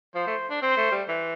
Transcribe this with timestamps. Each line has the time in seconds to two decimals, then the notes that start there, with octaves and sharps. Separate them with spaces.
0.15 F3 C5
0.27 A3
0.50 D4
0.62 C4 C5
0.77 A3
0.92 G3
1.08 E3